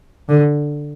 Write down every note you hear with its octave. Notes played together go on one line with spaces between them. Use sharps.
D3